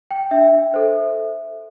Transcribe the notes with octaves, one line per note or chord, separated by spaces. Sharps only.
G5
D4 E5
A4 C5